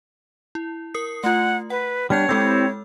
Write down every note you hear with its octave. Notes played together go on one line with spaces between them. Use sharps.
E4
A#4 D#6 C7
A3 F4 F#5
B4 F#5
G3 B3 D4 C#5 F6 G6
G#3 C4 E4 G4 A4 E6